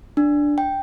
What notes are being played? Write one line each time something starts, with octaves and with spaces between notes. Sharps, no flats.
D4
G5